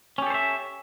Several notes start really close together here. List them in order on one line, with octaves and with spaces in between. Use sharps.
C#4 G4 A4 C5 E5